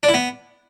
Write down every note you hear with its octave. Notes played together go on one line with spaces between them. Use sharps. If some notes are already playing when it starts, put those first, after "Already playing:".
D4
E4
B3